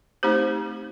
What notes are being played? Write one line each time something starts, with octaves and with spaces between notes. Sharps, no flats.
A3 C4 D#4 G4 C5